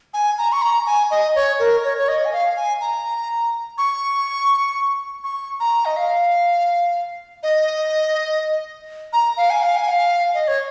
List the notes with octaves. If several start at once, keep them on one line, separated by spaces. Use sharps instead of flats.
G#5
A#5
C#6
A#5
G#5
D#5
C#5
A#4
C#5
C#5
D#5
G#5
F5
G#5
A#5
C#6
C#6
A#5
D#5
F5
D#5
A#5
F5
G#5
F5
G#5
F5
D#5
C#5